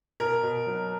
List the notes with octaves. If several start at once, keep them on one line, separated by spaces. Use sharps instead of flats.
B2 A#4
B2
F#3